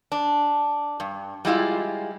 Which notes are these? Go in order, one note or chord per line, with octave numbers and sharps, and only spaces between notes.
D4
G2
G3 G#3 E4 F4